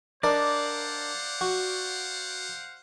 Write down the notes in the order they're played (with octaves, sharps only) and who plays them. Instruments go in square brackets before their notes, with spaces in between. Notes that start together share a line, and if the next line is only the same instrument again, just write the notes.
[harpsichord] D4 A#4 D#5 [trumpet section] C5 F5 F#5 [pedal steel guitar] D5
[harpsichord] F#4